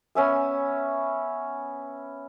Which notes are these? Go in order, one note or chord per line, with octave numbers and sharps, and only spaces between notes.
B3 C#4 E5 G#5